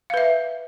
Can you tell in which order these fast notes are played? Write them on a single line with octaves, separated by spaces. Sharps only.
F5 B4 E5